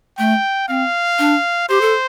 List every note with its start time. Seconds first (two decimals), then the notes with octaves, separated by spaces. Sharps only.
0.18 A3 G5
0.68 C4 F5
1.19 D4
1.69 G4 C5
1.81 A4